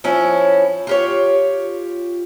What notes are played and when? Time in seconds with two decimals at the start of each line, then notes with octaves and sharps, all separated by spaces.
0.04 F3 C#4 E4
0.87 F4 G4 C#5